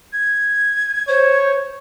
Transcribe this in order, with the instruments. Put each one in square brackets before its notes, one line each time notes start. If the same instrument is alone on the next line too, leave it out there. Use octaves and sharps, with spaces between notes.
[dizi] G#6
[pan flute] C5 [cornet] C#5